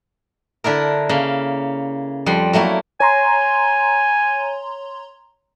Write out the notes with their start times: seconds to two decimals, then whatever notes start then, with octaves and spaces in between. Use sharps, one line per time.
0.64 D3 D4 E4 A#4
1.09 C#3 A#3
2.26 F2 G3 F#5 C6
2.53 F#3 A3 A#3 E4
3.00 C#5 G#5 A#5 C6